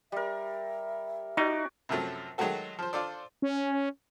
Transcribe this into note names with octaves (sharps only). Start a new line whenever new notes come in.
G3 A#4 E5
D#4 E4 F#4 D5
F#2 C3 F3 F#3 A3
D#3 F#3 G#3 A3 F#4 A4
F3 C5
D4 F4 A4 C5 D5
C#4